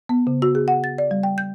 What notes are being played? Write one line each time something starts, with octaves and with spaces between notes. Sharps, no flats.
B3
C#3
F#4
G#4
F#5
A6
D5
G3
G5
G6